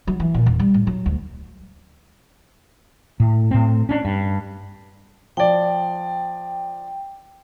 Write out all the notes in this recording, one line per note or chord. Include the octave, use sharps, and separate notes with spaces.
F#3
E3
A#2
E1
G3
A2
F#3
D2
A2
A2 C4
C#4 D4
G2
F3 D5 G5